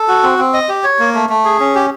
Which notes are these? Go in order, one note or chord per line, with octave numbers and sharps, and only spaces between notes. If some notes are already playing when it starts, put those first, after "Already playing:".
Already playing: A4
F#4
C4
C4
D#5
G4
C#5
A#3
A3
A3
G#4
C#4
G4